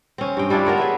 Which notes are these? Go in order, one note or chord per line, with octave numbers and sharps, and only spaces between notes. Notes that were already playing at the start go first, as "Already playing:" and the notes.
C4 C#4
G2 G5
G3 D4 E4 F4
B3 A#4 C#5 F#5
G#4 B4 E5